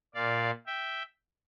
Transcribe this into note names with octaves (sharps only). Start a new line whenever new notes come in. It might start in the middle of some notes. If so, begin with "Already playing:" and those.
A#2 D5 F5
E5 G5